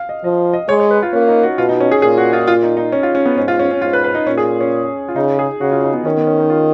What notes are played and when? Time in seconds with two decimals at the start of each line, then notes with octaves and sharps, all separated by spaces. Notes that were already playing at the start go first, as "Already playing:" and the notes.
Already playing: F5
0.09 D#5
0.24 F3 D#5
0.53 D#5
0.68 G#3 C#5
0.80 C#5
0.90 B4
1.03 F4
1.13 A#3 C#4
1.28 D#4
1.43 F#4
1.58 B2 F4
1.69 D#4
1.80 C#4
1.91 G#4
2.02 A#2 G#4
2.18 F#4
2.33 F4
2.48 F4
2.63 D#4
2.77 D#4
2.92 C#4
3.03 F4
3.15 C#4
3.26 B3
3.37 G#2 C#4
3.48 F4
3.59 C#4
3.71 C#4
3.82 G#2 F4
3.93 B4
4.04 B4
4.15 D#4
4.27 A#2 C#4
4.38 G#4
4.61 C#4
5.09 F4
5.15 C#3 D#4
5.39 G#4
5.61 C#3 F#4
5.72 F4
5.83 D#4
5.94 B3
6.05 D#3 C#4
6.17 B3
6.27 C#4
6.39 D#4
6.50 F4